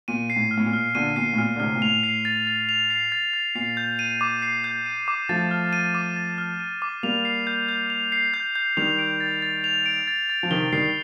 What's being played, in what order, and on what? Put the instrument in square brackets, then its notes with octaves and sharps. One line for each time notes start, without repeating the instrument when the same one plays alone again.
[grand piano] A#2 [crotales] D#7
[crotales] C7
[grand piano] A2
[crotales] F6
[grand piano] A2
A#2
[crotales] F6
[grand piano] A#2 D3 [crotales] D#7
[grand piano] A#2 [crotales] C7
[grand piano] A2
[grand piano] A#2 [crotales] F6
[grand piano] D3
[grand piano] A2 C3 [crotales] F6
[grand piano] A#2
[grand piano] A2 [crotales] F7
[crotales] C7
A6
A6
F7
C7
A6
A6
[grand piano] A#2 [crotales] C7
[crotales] G6
D#7
D6
C7
G6
D#7
D6
[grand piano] F3 A3 [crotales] A6
[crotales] F6
D#7
D6
A6
F6
D#7
D6
[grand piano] G3 A#3 [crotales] F7
[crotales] C7
G6
G6
F7
C7
G6
G6
[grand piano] D#3 G3 [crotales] F7
[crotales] D7
A6
A6
F7
D7
A6
A6
[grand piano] F3
[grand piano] C3 D#3 [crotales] G7
[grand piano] D#3 G3 [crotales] C7